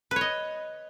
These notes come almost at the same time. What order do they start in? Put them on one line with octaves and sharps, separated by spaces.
B4 C#5 D#5